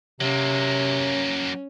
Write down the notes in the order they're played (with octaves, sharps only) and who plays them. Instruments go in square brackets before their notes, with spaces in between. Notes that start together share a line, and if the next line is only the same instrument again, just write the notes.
[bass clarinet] C3 [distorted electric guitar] F#3 A#3 [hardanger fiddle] C#4